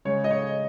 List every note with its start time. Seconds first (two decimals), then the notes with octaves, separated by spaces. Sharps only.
0.05 C#3 G#3 C#5
0.24 D#5
0.31 C#5